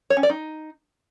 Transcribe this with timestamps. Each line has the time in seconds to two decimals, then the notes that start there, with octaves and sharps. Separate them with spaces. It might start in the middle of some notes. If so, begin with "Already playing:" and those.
0.10 C#5
0.17 C#4
0.23 D5
0.30 D#4